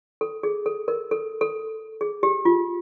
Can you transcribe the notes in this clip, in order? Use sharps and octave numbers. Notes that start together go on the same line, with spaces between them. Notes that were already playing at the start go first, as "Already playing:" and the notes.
A4
G#4
A4
A#4
A4
A4
G#4
G4
F4